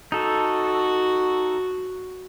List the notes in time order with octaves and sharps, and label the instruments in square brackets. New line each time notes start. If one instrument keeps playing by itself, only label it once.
[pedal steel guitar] D#4 A4 [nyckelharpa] F#4